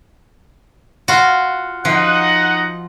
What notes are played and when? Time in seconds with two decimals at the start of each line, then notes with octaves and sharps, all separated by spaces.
1.08 F4 F#4
1.85 F3 D#4 D#5 F#5